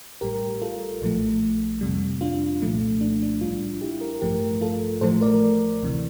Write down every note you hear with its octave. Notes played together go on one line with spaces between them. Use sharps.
A1 A2 G3 G4 A#4
F4 A4
A#1 A2 F3 A3
F2 C3 G3
D4 F4
C2 A#2 F3 A3
D4
D4
A1 A2 G3 D4 F4
E4 G4
G4 A#4
A1 G2 F3 A3 G4 A#4
F4 A4
A1 A2 F3 A3 A4 C5
A#4 D5
D2 C3 E3